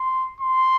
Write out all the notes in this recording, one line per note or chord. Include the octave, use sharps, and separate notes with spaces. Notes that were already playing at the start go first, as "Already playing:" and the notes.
Already playing: C6
C6